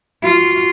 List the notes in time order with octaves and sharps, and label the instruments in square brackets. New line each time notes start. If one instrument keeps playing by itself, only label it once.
[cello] F4 [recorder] F#4